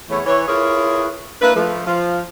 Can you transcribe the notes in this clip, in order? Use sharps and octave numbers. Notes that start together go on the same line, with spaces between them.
E2 A3 E4 C#5
E3 C#5
E4 F4 G#4 A#4 B4 C#5
A#3 D4 E4 B4
F3 A3
F3 F4